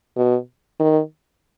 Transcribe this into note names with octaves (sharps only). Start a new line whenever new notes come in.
B2
D#3